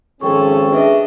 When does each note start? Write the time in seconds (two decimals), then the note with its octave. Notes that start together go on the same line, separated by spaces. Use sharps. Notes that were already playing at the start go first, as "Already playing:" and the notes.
0.21 G#1 F3 C#4 G#4 A4 G5 C#6
0.71 D4 G#4 B4 D#5 E5